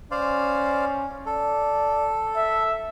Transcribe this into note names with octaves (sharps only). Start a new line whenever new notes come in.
C#4 C5 D5 F5
A4 D5
E5